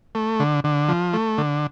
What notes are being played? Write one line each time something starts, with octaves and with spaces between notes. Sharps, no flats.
A3
D3
D3
F3
A3
D3